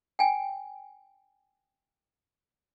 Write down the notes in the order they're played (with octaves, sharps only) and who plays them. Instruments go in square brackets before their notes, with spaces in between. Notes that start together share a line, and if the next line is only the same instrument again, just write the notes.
[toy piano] G5 G#5